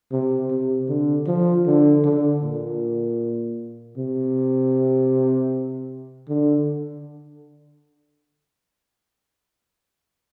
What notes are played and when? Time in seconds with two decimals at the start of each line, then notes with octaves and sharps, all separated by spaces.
0.12 C3
0.51 C3
0.89 D3
1.28 F3
1.66 D3
2.05 D3
2.43 A#2
3.98 C3
6.29 D3